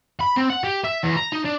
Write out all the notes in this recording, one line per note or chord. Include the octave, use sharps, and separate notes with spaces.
B5
C4
F#5
G4
E5
E2
A#5
D#4
D4